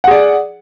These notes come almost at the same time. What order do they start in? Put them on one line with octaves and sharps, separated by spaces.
F#5 G#4 D5